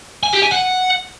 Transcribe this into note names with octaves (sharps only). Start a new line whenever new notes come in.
G#5
G4
G#5
F#5